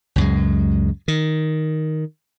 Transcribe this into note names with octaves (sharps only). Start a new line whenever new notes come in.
C#2 F#2 G#3
D#3